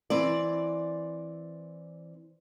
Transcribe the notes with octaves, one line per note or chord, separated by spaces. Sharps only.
E3 C4 D5